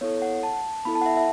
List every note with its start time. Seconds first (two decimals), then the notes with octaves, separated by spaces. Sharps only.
0.01 B3 E4 A4 C#5
0.22 F#5
0.43 A5
0.85 B3 E4 A4 B5
0.95 A5
1.01 F#5
1.06 E5
1.17 E5